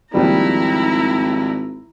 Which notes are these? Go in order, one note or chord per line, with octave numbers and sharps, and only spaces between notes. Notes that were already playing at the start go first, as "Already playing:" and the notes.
G#1 D#2 F3 G3 E4 A#5